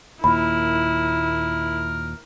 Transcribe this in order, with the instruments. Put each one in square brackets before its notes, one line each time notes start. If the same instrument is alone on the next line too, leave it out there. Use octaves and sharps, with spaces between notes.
[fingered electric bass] D#2 A#2 [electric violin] E4 [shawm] A#4 [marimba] B5